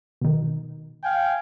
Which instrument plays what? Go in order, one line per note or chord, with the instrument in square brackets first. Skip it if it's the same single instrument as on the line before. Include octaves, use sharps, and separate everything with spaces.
[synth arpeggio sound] B2 D#3
[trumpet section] F5 G5 G#5